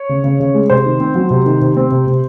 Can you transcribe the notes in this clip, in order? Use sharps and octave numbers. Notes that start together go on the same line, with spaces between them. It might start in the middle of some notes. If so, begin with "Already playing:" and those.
Already playing: C#5
C#3
C#3
C#3
G#3
C3 C5
D#3
C4
F#3
C3
D#3
C3
C4
C3
C3